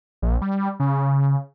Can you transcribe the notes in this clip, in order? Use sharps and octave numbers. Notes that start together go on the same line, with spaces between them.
A#1
G3
C#3